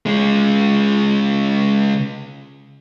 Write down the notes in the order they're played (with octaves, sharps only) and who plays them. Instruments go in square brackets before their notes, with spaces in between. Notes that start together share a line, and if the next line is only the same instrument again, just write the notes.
[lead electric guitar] C#3 G#3